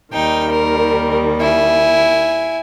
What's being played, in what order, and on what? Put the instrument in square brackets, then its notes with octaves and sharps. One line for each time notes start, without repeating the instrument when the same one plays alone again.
[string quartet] D#2 D#3 G3 [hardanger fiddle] D#4 G5
[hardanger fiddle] A#4
E4 G#5